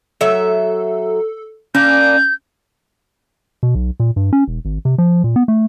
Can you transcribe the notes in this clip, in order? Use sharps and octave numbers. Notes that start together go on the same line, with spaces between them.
F#3 A4 E5
A#3 C#4 D4 G6
B2
B1
A#2
G2
C#4
E1
G#1
C3
F3
A#2
B3
A3